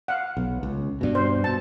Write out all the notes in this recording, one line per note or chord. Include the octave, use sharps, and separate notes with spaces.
F5 F#5
B1
C#2
G2 B2
C5
B2 A5